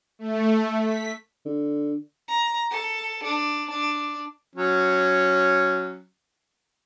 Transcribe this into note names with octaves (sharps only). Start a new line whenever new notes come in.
A3
B6
D3
A#5
A4
D4
D4
F#3 C#4